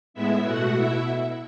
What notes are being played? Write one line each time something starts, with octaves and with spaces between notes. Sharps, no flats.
A2 G#3 B3 E4 E5
B2 A3 F#4 F#5
B2 E4 E5